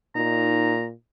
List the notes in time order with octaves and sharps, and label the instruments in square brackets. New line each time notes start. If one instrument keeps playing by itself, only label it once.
[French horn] A#2 [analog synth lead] D#4 [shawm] A#5